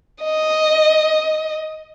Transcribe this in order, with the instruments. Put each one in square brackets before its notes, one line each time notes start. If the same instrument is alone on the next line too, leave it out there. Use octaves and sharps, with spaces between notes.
[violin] D#5